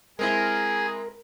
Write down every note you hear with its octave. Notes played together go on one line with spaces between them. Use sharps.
G#3 C4 E4 G#4 A#4